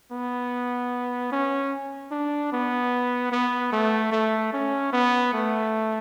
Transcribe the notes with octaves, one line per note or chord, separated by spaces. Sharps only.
B3
C#4
D4
B3
B3
A3
A3
C#4
B3
A3